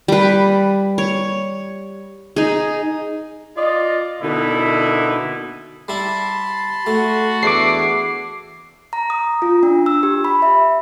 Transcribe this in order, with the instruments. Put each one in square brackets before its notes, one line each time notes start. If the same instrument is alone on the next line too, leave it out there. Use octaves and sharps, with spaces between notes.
[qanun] G3 B4
C#5
D#4 G#4
[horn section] F4 D5 D#5
B2 D3 A#3 D#4 E4
[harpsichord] G3 E4 [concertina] A5 B5 C6
[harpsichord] A3 [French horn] F#4
[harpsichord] E2 [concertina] A3 D4 E4 [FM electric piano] D6 C7
[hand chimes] A#5
D#6
F4
D4
E6
G4
B5
E5